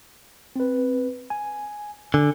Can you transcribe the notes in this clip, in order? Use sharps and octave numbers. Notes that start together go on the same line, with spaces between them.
C4 B4
G#5
D3 G#5